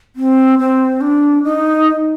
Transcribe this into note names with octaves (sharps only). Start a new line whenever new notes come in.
C4
C4
D4
D#4